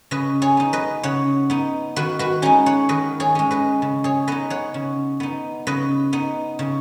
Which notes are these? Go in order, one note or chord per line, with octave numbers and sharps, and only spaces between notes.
C#3 B4 D#5
G#4 C#5
B3 D#4
B4 D#5
C#3 C#5 F#5
B3 D#4
D#3 F#4 B4
F#4 B4
G#3 C#4 D#4 G#4
C#5 F#5
D#3 B4 D#5
G#4 C#5
G#3 C#4
B4 D#5
C#3
G#4 C#5
B3 D#4 B4 D#5
C#5 F#5
C#3
B3 D#4
C#3 B4 D#5
B3 D#4
C#3